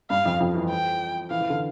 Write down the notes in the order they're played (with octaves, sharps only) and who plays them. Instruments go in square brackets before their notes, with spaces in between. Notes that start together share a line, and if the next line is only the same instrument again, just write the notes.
[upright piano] G2 G3 [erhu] F5
[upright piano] F2 F3
F2 F3
E3
[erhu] G5
[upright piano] E3 [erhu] F5
[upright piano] E3
D3